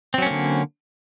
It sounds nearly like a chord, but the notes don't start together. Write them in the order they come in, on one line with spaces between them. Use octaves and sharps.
C4 F#3 C#4 A#3 D3